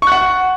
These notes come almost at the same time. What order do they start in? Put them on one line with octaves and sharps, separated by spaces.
C#6 F#6 F#5